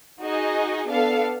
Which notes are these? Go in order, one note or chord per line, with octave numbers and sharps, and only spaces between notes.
D#4 F#4 G#4 D#5
B3 D4 A4 F5